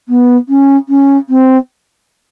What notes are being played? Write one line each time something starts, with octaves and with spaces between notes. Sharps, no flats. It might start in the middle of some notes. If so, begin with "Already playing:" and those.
B3
C#4
C#4
C4